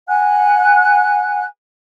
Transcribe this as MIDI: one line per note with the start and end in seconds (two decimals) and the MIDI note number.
0.09 1.43 78
0.09 1.43 80
0.09 1.43 90